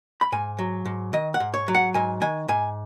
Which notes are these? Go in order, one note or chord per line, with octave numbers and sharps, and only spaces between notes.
B5
G#2 G#5
F#3
G#2
D#3 D#5
F#5
G#2
C#5
F#3
F#5
G#2 G#5
D#3 G#5
G#2 G#5